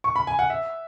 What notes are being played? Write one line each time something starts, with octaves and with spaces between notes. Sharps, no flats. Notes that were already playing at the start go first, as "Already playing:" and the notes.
C#6
B5
G#5
F#5
E5